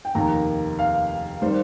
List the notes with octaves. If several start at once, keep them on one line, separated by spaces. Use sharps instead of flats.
G5
F1 D#2 D#3 A#3 A#5
F5
D#3 G3 C5